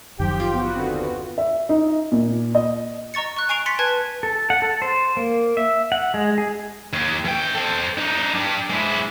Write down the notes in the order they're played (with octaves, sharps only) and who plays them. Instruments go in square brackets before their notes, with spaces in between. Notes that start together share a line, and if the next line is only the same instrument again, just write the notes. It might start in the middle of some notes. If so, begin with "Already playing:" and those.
[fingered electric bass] F#1 F#2 D#3 [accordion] F3 G4 G5
[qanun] F4
[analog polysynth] B3 F#4
[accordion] D#2 D3 C4
[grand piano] E5
D#4
A#2
D#5
[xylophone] D#5 A#5 C#6 A6 C#7
C#6 F#6
G#5 C#6 C7 D7 F7
C6 A6 B6 C#7
B4 G#5 A5 F#6 G#6
[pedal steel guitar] A4
F#5
A4
C5
A#3
E5
F#5
G#3
G#4
[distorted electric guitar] D#2
E3 G5
A4 C5
D4 D#4
G3 D4
G#3 E4